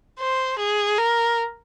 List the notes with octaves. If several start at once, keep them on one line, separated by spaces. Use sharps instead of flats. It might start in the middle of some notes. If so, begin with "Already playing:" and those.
C5
G#4
A#4